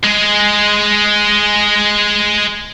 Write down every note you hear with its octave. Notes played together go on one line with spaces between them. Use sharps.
G#3 G#4